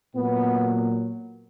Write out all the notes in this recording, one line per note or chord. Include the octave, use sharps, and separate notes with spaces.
A#2 F#3 B3